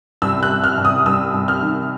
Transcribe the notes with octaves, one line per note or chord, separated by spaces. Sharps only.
C2 E6
F#6
C2
F6
C2
D#6
C2 E6
C2
F6
D#3